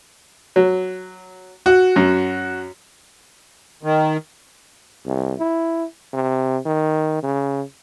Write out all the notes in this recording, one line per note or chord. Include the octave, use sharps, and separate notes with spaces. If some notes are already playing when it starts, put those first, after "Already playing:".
F#3
F#4
F#2
D#3
C2
E4
C3
D#3
C#3